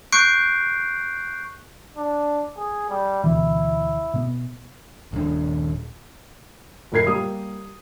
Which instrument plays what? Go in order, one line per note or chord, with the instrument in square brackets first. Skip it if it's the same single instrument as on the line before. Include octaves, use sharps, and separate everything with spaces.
[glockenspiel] C#6 F#6 G6 C7 D7
[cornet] D4
G#4
G3
[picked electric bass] D2 B2 E3 [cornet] E4
[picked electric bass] B2 B3
[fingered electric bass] D#1 D4
[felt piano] F#1 A#2 A#4 G#6 C7
G3 A#3 G4 D#6